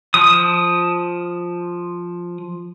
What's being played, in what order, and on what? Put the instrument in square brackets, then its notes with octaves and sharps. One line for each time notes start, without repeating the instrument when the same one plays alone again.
[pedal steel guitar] F3 D#6